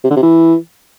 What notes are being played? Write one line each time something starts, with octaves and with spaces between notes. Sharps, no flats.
C3
D3
C3
E3